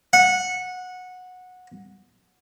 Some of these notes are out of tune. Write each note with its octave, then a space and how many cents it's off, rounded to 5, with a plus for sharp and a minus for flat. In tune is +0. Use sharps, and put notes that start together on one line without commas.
F#5 -15